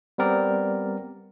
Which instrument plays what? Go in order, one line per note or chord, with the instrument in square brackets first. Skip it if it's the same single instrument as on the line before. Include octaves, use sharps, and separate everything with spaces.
[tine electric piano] G3 B3 C4 A#4 D5